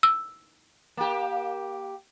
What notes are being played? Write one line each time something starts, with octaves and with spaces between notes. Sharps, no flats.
E6
A#3 G4